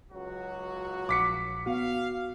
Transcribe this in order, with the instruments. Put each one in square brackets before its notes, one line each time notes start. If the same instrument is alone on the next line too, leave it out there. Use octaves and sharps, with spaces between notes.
[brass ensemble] C#2 F#3 F#4
[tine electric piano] A#1 [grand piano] D6 B6 C#7
[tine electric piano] B3 F#4 [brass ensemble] F5